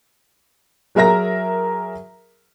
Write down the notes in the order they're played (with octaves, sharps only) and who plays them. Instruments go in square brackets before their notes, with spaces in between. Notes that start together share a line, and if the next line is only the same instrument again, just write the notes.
[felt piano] F#3 G#4 A#4 E5 A#5 A#6